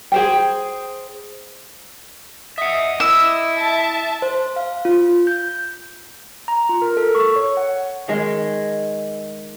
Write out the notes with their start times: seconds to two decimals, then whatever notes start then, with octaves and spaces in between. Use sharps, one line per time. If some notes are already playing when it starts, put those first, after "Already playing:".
0.12 G#4 C5 G5
2.58 D#5 E5 F#5 D#6
3.00 E4 E6
3.56 E5 A5
4.22 C5
4.56 F5
4.85 F4
5.27 G6
6.48 A#5
6.69 F4
6.82 A#4
6.97 A4
7.15 C#6
7.36 C#5
7.57 F#5
8.08 D#3 G#3